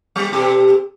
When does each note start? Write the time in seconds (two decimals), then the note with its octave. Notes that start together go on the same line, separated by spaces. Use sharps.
0.16 G3
0.32 B2 G4 A4